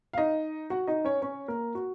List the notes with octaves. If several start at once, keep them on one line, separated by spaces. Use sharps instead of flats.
F5
D#4 D#5
F#4 F#5
D#4 D#5
C#4 C#5
C#4 C#5
A#3 A#4
F#4